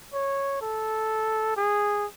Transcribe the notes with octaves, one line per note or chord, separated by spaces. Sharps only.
C#5
A4
G#4